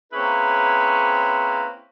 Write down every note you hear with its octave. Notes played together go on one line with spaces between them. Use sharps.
A#3 C4 C#4 E4 G#4 B4